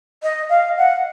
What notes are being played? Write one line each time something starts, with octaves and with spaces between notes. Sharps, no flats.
D#5
F5
F#5